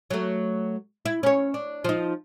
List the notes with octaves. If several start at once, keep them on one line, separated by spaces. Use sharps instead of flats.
F#3 A3
E4
C#4 C#5
D4
F3 D#4